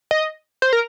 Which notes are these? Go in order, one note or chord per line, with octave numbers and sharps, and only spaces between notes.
D#5
C5
A#4